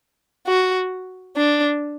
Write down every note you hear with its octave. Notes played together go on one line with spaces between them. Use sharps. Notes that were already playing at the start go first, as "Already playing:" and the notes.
F#4
D4